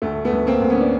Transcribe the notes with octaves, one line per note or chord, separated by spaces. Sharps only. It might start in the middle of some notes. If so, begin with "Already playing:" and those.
D2 A3
A3 B3
D2
A#3 C4
D2
B3 C#4
D4